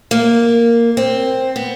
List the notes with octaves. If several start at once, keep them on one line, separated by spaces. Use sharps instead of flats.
A#3
C4
B3